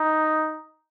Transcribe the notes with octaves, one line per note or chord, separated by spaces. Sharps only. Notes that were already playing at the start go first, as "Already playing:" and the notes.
Already playing: D#4